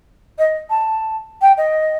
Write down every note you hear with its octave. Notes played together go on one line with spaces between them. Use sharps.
D#5
A5
G5
D#5